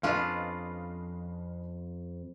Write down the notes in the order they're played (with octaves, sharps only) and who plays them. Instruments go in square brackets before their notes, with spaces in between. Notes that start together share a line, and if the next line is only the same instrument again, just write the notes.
[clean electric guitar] F2 [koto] C#4 D4 F4 [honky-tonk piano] B4 D#5 F5